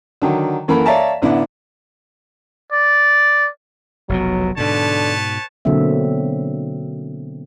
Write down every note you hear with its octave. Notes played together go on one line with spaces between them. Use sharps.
D3 D#3 F#3
F#2 E3 A#3 A4 A#4 B5
C#5 D5 E5 F5 A5 A#5
A1 D3 B3 D4 E4
D5
F1 B1 B2 F#3
G#2 B2 D3 B4 C#5 A5
B2 D3 F#3 A#3 C4 E5